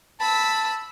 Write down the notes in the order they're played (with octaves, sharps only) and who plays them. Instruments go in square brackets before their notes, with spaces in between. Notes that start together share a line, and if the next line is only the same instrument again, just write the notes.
[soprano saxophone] A5 [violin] B5 E6